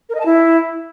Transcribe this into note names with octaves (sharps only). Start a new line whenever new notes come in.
A#4
D#5
A5
E4